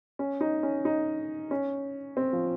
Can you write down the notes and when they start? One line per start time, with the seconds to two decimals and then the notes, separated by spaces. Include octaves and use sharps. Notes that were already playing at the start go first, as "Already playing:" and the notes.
0.19 C#4
0.41 D#4
0.63 C#4
0.85 D#4
1.51 C#4
2.17 C4
2.33 F3